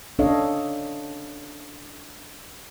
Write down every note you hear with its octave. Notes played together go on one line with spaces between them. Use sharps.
C#4 D4 A4 C#5 D#5 F5